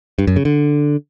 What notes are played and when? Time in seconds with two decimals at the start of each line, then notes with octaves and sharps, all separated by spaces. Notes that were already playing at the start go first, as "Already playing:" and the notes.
0.19 G2
0.27 F#2
0.36 C#3
0.45 D3